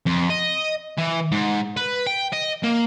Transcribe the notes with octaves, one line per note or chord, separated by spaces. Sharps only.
F2
D#5
E3
G#2
B4
G5
D#5
A#3